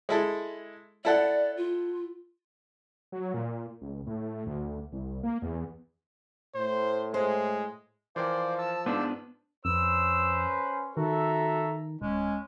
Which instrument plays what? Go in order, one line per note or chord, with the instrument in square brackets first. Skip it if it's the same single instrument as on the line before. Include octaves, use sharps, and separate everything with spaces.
[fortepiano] G#3 E4 A4
[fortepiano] E4 A4 F#5 [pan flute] D5
[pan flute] F4
[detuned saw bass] F#3
A#2
C#2
A2
D2
C2
A#3
E2
[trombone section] A2 [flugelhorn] C5
[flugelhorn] G#3 [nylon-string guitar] C5
[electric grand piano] E3 A#4 G5 [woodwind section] F3 [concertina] C5 D5
[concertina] A5 E6
[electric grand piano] G#2 [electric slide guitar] B3 D4 [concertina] C5 D5 E6
[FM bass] F2 [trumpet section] C#4 B4 C5 [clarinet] E6
[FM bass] D#3 [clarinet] F#4 [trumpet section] A4 E5 A#5
[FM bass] D1 [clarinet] G#3 [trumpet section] C#4